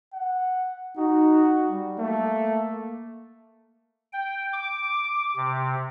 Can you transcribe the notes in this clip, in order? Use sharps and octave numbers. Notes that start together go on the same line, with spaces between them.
F#5
D#4 F#4
G3
A3 A#3
G5
D6
C3